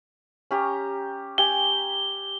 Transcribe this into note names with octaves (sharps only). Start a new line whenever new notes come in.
C#4 G4 A#5
G4 G5 G#5 G7